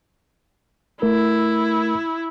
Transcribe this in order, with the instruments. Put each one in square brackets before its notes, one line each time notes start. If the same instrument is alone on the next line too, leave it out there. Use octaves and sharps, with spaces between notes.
[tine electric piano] A3 A#4 [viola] E4